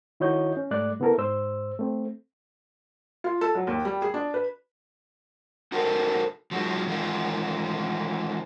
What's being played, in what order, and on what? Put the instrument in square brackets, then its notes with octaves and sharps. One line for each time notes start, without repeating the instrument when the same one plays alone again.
[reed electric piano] D#3 E4 F#4 C#5 D#5 G6
C#4
G#2 G3 A3 D5 F#6
C#3 B3 E4 A4 A#4
G#2 C5 E6
A3 C4
[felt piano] F4
A4
F#3
D#2
G3
G#4
D4
B4
[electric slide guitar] D#4 F#4 A4 A#4 C5
F3 F#3 G#3 D#4
D#3 E3 G#3 D#4 F4